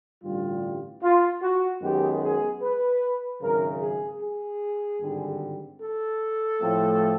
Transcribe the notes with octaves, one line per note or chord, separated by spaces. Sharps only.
A1 G2 D3 G3 F4
F4
F#4
F#2 D#3 G#3 B3 G4
G#4
B4
G#1 F#2 C#3 A#4
G#4
G#4
G#1 G2 D3 G3
A4
A2 F3 A3 C4